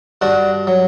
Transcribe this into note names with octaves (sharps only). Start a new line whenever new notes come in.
G2 D4 F#4
F#3